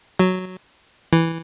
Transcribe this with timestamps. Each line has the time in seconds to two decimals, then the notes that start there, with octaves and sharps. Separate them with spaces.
0.19 F#3
1.13 E3